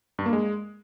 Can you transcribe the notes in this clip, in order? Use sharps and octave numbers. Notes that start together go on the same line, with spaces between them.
G2
A#3
G#3